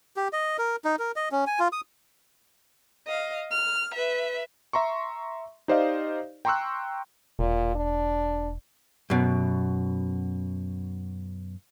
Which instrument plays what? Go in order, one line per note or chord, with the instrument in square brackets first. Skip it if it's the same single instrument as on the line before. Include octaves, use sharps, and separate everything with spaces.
[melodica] G4
D#5
A#4
D#4
A#4
D#5
C#4
G#5
F4
D#6
[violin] D#5 F5
F6
B4 E5
[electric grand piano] E5 A#5 C6 C#6
D#4 G4 C5 D5 D#5 F5
G5 A#5 C6 C#6 E6 F#6
[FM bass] E1 [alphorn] A#2
[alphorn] D4
[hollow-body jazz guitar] F#2 B2